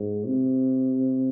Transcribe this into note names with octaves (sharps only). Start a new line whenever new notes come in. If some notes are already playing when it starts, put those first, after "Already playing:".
Already playing: G#2
C3